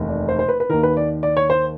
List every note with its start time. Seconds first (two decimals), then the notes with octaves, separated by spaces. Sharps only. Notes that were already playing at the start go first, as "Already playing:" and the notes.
Already playing: F1 D#2 E3
0.09 D5
0.29 C5
0.39 C5
0.49 B4
0.60 B4
0.70 D#2 D#3 A#4
0.83 B4
0.97 D5
1.23 D5
1.37 C#5
1.50 C5